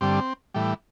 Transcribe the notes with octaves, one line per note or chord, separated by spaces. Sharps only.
G2 D3 G3 C4
A2 E3 G3